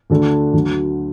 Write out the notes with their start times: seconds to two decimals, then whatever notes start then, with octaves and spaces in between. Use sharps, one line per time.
0.10 D2 D3 A3 D4 A4
0.53 D2 D3 F#3